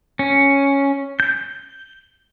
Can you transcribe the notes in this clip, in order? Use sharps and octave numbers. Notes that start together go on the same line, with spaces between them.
C#4
G6